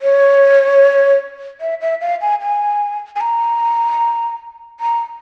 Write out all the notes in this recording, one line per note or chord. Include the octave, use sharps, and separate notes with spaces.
C#5
E5
E5
F5
G#5
G#5
G#5
A#5
A#5